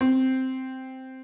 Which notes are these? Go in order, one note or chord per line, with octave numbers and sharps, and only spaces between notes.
C4